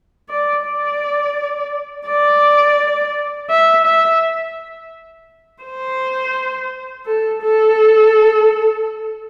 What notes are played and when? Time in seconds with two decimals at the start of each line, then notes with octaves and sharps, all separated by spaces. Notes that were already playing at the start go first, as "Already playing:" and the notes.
0.29 D5
0.65 D5
2.08 D5
3.50 E5
3.86 E5
5.64 C5
7.06 A4
7.43 A4